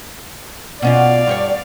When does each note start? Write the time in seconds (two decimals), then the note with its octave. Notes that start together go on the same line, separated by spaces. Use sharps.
0.82 B2 C#4 F4 D5 F5
1.27 G2 G4 C#5